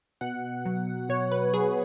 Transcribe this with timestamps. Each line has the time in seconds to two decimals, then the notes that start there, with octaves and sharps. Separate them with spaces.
0.21 B2 F#5
0.66 F#3
1.09 B2 C#5
1.32 B4
1.54 F#3 G#4